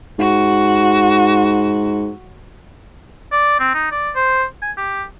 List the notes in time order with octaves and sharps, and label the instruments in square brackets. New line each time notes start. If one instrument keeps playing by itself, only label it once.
[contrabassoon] G#2 [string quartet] F#4
[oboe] D5
C4
D#4
D5
C5
G#5
G4